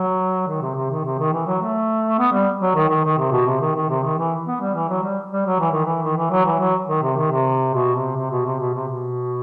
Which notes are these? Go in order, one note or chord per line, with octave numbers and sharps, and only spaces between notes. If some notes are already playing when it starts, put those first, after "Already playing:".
Already playing: F#3
D#3
C3
C3
D#3
C3
D#3
E3
F#3
A3
B3
G3
F#3
D#3
D#3
D#3
C3
B2
C3
D#3
D#3
C3
D#3
E3
B3
G3
E3
F#3
G3
G3
F#3
E3
D#3
E3
D#3
E3
F#3
E3
F#3
D#3
C3
D#3
C3
B2
C3
C3
B2
C3
B2
C3
B2